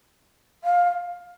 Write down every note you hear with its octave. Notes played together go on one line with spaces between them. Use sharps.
F5